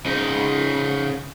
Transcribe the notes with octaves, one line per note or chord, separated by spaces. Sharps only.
C#3 D#4